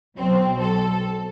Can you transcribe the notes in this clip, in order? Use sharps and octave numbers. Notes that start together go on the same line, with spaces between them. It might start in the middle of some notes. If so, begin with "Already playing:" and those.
B1 B2 F#3 C4
A4